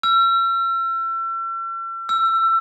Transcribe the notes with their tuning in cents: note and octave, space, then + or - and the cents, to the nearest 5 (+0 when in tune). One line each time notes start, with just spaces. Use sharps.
E6 +40
E6 +30